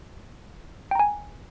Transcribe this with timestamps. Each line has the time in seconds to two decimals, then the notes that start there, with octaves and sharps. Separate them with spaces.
0.91 G5
0.95 A#5
0.99 G#5